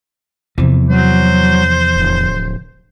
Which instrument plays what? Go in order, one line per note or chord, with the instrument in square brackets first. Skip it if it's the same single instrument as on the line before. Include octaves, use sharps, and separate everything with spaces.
[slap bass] E2 E3 [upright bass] C3 F3
[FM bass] F#3 [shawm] C5
[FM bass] D1